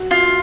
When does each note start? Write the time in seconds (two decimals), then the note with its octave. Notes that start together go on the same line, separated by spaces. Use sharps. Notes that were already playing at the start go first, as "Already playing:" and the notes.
Already playing: F#4
0.11 F4